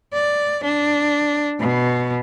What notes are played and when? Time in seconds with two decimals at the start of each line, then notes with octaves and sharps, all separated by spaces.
0.13 D5
0.64 D4
1.60 B2